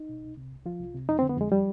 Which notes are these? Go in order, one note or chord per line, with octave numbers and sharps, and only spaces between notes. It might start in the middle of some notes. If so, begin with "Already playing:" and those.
Already playing: D#4
B2
C2
C3
C2
F3 F4
C2
C3
F2 D#4
C4
D3
B3
F2 G#3
F3 G3